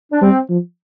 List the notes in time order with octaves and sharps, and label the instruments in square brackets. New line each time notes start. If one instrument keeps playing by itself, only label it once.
[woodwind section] D4
[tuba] G3 [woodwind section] C4
[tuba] F3